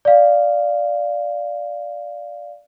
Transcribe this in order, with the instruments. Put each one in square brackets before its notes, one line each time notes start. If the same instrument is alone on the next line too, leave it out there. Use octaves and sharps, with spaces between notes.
[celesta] D5 F5